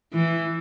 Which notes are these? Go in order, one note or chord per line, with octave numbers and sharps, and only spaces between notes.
E3